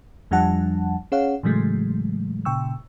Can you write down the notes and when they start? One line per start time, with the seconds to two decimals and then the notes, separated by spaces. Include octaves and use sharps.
0.31 F2 F3 G3 D4 F#5 A5
1.12 C#4 G#4 C#5 F5 F#5
1.43 A2 C#3 E3 F#3 G#3 A3
2.45 A#2 C#3 G5 C#6 E6